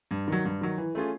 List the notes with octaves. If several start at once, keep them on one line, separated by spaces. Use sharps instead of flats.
G2
D#3 F#3
G2
D#3 F#3
E3
A3 C#4 F4 G#4